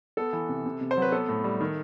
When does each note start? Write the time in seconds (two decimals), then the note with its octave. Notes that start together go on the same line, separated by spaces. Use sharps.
0.17 B3 A4
0.33 E3
0.49 C3
0.66 C3
0.81 C3
0.91 C5
0.97 F#3
1.02 B4
1.12 B3 A4
1.29 A2
1.44 G3
1.61 D#3